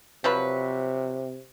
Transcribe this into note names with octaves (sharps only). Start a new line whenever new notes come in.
C3 F3 F#3 B4